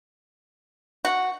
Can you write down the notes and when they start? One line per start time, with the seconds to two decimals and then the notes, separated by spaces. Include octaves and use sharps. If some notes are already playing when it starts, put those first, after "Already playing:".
1.05 F#4